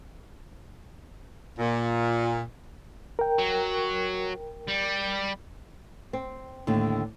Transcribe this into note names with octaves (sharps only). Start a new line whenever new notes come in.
A#2
A#4 G5
F#3
G3
C4
D#2 A2 D3